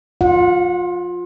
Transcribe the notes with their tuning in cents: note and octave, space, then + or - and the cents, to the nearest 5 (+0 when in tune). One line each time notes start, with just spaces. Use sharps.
F4 +20 F#5 -25